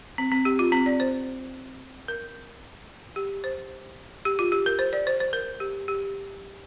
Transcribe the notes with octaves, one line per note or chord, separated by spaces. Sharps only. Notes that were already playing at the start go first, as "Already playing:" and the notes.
C4
C4
G4
F4
C4
D5
C5
A#4
G4
C5
G4
F4
G4
A#4
C5
D5
C5
C5
A#4
G4
G4